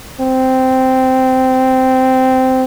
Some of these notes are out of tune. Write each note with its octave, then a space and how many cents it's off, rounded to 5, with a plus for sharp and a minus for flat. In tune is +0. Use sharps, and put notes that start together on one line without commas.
C4 -10